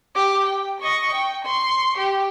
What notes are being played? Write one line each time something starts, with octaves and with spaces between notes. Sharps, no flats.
G4 D6
G5
D#5 C#6
G5
C6 C#6
G4